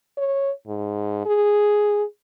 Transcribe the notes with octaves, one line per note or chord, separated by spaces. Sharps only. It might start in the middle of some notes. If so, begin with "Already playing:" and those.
C#5
G#2
G#4